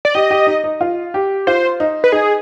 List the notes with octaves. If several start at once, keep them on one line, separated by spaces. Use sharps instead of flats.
D5
G4 D#5
G4
D#4
D#4
F4
G4
F4 C5
D#4
B4
D#4 G#4